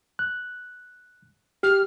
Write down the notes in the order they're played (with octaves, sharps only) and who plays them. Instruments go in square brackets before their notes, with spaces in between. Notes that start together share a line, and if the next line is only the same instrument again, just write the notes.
[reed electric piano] F#6
[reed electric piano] G4 [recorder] F6